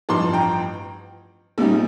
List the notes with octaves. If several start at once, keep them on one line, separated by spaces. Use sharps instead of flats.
A1 G2 F3 A5 C6
G5 A#5
A#1 A#2 G3 C4 D#4